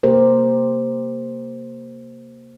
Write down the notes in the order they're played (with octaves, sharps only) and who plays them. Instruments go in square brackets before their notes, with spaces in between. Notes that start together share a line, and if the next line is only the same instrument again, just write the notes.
[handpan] C3 A#3 G4 A#4 C5